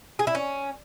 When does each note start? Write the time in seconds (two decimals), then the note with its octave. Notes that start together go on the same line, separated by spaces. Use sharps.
0.19 G#4
0.27 E4
0.35 C#4